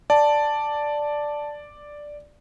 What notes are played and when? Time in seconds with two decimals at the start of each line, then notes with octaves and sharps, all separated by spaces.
0.10 D5 A5